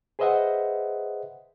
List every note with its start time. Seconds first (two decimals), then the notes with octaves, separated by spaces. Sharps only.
0.19 G#4 B4 C5 D#5 E5 F#5